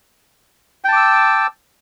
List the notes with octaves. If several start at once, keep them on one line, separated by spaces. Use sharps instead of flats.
G5 A5 D6 E6